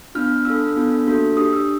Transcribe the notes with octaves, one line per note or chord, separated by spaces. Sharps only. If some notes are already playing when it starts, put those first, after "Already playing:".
B3 D4 F4 F6
D4 F4 A4 E6
B3 D4 F4 A4
A#3 D4 F#4 A4
D4 G4 D#6
E6